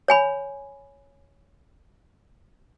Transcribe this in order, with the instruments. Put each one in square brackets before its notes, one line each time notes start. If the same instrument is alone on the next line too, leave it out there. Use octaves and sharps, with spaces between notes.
[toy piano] C#5 G#5 B5